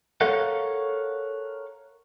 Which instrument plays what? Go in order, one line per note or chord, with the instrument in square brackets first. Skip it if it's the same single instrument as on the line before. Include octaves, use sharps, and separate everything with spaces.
[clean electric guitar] A4 A#4 C#5 F5 F#5